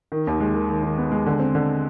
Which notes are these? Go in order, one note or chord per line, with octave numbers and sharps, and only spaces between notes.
D#3
D#2
G#3
D#3
D#3
D#3
B3
G#3
D3
C4
D3